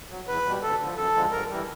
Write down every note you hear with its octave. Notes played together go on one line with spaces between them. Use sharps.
F#3
E2 B4
B2 G3
D2 A4
D3 F3
F#2 A4
D3 F3 G#3
G2 A#4
E3 G3